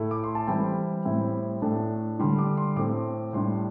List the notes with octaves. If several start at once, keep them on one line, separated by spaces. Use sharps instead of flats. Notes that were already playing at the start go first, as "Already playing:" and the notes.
Already playing: A2 A3 E4
D6
C6
A5
E3 G3 C4 E4 G5
A2 G3 C4 E4
A2 A3 D4 A5
D3 G3 D4 C6
D6
C6
A2 A3 C4 D6
A2 G3 D4 C6